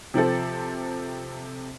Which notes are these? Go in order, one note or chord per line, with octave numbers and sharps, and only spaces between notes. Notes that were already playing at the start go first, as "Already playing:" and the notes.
C3 F3 C4 A4